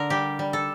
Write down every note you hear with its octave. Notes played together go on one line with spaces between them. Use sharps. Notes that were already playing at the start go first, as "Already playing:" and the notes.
Already playing: D3 A#4
G3 G4
G3
A4